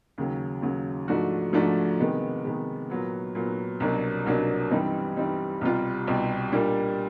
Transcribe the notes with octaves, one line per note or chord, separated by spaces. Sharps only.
D#2 C#3 F#3
D#2 C#3 F#3
G#2 F3 A3 D4 F#4
G#2 F3 A3 D4 F#4
C3 D#3 G#3 B3
C3 D#3 G#3 B3
A#2 F#3 B3
A#2 F#3 B3
C2 B2 F#3 A#3 D4
C2 B2 F#3 A#3 D4
G2 E3 G3 C4 D#4
G2 E3 G3 C4 D#4
C2 B2 G3 C4 F4
C2 B2 G3 C4 F4
A#2 G3 A#3 D4